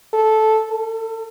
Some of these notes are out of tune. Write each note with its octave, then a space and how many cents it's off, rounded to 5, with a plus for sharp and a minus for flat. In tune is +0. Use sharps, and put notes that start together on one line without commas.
A4 -10
A4 +40